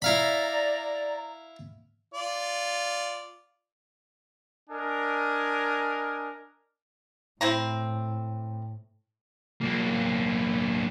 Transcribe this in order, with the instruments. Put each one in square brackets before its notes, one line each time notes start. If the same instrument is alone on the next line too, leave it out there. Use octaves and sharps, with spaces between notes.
[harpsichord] E4 F5 B5 [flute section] D5 A#5
[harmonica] F4 D5
[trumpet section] D4 A#4 D#5 G#5
[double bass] A2 [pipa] C4 E4 A#5
[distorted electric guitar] B1 A#3